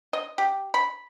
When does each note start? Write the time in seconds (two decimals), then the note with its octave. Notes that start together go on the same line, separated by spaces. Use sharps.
0.13 D#5
0.38 G4
0.74 B5